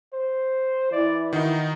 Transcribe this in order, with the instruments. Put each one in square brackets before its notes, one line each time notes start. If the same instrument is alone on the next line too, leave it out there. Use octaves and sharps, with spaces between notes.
[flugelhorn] C5
[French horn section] E3 E4 [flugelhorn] D5
[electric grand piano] D#3 D#4 [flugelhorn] F#4